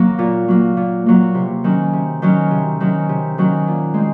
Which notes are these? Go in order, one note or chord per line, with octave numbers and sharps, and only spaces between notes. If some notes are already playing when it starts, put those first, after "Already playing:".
Already playing: F#3 A#3
A#2
F#3 A#3
A#2
F#3 A#3
C3
D#3 F#3 C#4
C3
D#3 F#3 C#4
C3
D#3 F#3 C#4
C3
D#3 F#3 C#4
A#2
G#3 C4